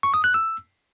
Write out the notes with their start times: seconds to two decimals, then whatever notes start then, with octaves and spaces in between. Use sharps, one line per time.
0.03 C#6
0.14 D#6
0.24 F#6
0.34 E6